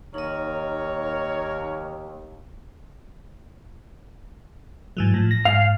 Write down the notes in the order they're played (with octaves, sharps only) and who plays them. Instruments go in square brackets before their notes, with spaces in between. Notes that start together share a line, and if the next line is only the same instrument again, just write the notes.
[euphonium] D#2 [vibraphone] D#4 D#5 [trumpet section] A#4 C#5
[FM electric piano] G#2 E3 F#3
A2 F3
A#6
[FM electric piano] G#2 F6 [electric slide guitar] F5